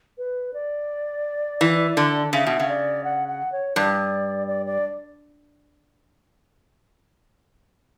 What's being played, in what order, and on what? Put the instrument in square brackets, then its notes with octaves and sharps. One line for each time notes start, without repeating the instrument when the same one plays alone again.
[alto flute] B4
D5
[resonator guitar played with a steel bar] E3
D3
[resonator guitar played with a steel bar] C#3 [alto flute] E5
[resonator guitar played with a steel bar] B2
C#3
[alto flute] D5
F#5
F#5
C#5
[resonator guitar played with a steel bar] G2 [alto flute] D5
[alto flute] D5
D5